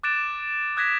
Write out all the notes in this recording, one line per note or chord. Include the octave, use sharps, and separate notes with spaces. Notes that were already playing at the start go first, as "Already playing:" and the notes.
D6 F#6 A6 D7 E7
D#6 F#6 G#6 A#6 B6 E7